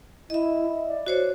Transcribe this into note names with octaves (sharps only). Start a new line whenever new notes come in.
E4 D#5 E5
D5
F#4 C5 C#5